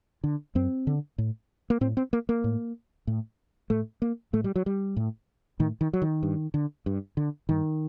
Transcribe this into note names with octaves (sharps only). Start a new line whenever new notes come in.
D3
F#2 C4
D3
A2
A#3
A2 C4
C4
A#3
A#3
A2
A2
A2 A3
A#3
A2 A3
G3
F#3
G3
A2
A2 D#3
D#3
F#3
D#3
G2
D3
G2
D3
G2 D#3